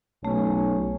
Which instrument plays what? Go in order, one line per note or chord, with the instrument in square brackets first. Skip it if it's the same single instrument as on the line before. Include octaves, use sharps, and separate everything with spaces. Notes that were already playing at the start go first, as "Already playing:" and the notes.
[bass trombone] B1 [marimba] A3 [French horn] C#4